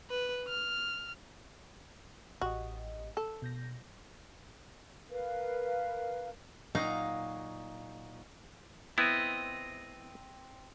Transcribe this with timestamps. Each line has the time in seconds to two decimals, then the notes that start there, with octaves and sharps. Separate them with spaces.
0.10 B4
0.48 F6
2.41 A1 F#4 G4 D#5
3.17 A4
3.42 B2 G6 A#6
5.10 A#4 B4 F5
6.75 A#2 F#3 D#4 F5 A#5
8.98 B3 C4 E4 D#5